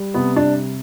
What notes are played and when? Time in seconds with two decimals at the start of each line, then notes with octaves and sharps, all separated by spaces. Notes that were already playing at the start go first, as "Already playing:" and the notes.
Already playing: G3
0.14 C3 B3
0.36 D4